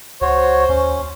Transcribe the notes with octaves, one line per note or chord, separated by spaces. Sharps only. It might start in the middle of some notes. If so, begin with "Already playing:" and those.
C#2 F#4 C5 C#5
D#2 C#4